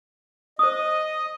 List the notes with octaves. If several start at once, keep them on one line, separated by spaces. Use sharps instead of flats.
C5 D#5 D#6